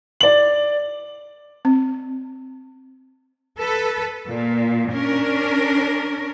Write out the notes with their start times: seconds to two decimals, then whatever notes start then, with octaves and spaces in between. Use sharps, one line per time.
0.21 D5 F#7
1.65 C4
3.59 A4 B4
4.27 A#2
4.91 C#4 D4 A#4